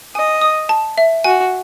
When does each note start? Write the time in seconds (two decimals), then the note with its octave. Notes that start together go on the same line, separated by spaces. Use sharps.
0.15 D#5 G#5
0.41 D#6
0.69 A5
0.98 E5
1.24 F#4 G#5